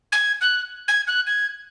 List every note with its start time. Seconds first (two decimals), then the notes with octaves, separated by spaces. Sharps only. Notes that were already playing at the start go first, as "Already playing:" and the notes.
0.12 G#6
0.41 F#6
0.88 G#6
1.08 F#6
1.27 G#6